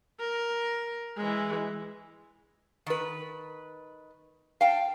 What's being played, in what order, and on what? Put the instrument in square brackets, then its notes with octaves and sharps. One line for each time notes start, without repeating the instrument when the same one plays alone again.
[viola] A#4
E3 G#3
[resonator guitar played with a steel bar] D#3 B4
F5 G5 A5